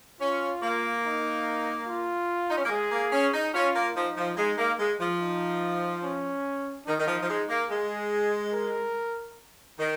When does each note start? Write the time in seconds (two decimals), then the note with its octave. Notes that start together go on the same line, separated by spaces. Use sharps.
0.20 C#4 F4
0.62 A#3
1.04 D#4
1.87 F4
2.49 D#4
2.57 C#4
2.64 A#3
2.70 G#3 G#4
2.91 A#3
3.12 C#4
3.33 D#4
3.53 C#4 F4
3.74 A#3
3.95 F3 D#4
4.16 F3
4.37 G#3 D#4
4.57 A#3
4.79 G#3
5.00 F3
5.20 D#4
6.03 C#4
6.86 D#3 D#4
6.98 D#3
7.07 F3
7.22 F3
7.28 G#3
7.49 A#3
7.70 G#3 G#4
8.53 A#4
9.78 D#3